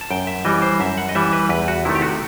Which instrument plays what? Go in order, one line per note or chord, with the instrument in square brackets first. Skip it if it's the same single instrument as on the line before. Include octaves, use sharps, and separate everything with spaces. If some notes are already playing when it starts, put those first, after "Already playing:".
[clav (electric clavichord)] A5
F#2 G5
E5
E3 G3 D#5
C5
F#2 E5
F#5
D#5
E3 G3 E5
B4
E2 B4
F#4
C3 D#3 A3 E4
G4
F#4